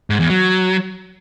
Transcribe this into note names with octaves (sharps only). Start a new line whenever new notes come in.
G#2
E2
F#3